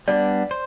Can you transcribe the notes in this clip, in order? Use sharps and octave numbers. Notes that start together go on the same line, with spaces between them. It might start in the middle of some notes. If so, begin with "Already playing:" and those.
G3 B3 D4 D5
C5